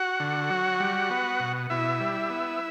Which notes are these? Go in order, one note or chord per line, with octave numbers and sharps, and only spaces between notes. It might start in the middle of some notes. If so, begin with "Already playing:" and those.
Already playing: F#4 F#5
D3
F#3
G3
B3
B2
B2 E4 E5
G3
B3